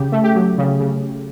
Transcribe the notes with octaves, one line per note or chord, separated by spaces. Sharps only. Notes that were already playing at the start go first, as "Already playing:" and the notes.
Already playing: C#3 G4
A3
G4
F#3
C#3
C#3